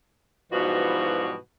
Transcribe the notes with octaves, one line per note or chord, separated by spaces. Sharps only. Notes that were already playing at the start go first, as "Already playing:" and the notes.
G#2 B2 E3 F3 G3 F#4